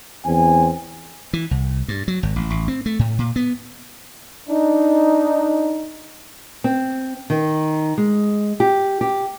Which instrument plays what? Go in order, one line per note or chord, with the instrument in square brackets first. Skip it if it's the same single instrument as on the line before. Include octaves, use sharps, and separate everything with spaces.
[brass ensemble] E2 C4 G#5
[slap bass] E3
C2
G2
F#3
G#1
A1
A1
C4
A3
A2
A#2
B3
[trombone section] D4 D#4
[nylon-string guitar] C4
D#3
G#3
G4
G4